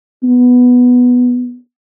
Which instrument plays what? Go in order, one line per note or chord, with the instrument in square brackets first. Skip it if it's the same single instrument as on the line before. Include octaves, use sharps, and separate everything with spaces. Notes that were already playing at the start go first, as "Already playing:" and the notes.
[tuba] B3